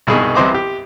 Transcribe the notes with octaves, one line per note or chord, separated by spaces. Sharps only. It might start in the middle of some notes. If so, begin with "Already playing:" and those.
C2 G2 B2 D#4 G#4 B5
C2 C3 E3 C5 D#5 D6
G4